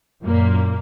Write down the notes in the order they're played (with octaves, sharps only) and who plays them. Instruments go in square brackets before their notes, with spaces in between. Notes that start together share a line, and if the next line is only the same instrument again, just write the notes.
[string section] F#2 A#2 A#3